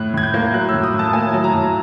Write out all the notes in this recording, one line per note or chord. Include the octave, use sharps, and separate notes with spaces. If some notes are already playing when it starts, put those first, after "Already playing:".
Already playing: A2 F#6
A2 G#6
G6
A#3
F#3 F#6
E6
A2
D#6
A2
A5
A#3 G#5
F#3
A#5
A2